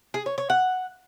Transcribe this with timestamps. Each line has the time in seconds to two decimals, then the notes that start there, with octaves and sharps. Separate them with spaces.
0.14 G#4
0.26 C#5
0.38 C#5
0.50 F#5